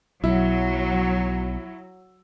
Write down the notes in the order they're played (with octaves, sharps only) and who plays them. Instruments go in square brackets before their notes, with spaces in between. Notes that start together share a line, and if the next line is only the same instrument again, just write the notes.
[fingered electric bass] B1 [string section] F#3 [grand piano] E4